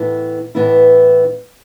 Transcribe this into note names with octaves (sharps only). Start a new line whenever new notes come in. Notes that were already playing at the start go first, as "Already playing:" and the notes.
Already playing: A2 E3 B3 E4
A2 E3 B3 E4